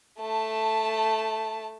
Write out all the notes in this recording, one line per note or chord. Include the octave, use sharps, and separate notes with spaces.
A3 A5